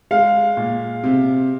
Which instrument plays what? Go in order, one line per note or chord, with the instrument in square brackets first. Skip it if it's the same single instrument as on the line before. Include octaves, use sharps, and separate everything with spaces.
[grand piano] G#3 [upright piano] F5
[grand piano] A#2
C3